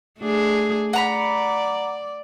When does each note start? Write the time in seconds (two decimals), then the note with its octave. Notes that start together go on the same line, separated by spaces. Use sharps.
0.20 A3 D4 G#4
0.93 D5 F#5 A#5 B5